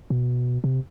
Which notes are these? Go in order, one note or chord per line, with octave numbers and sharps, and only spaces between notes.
B2
C3